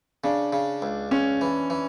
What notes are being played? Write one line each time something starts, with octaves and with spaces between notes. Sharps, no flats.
C#3 D4
C#3
C#2
C#2 C#4
E3
E3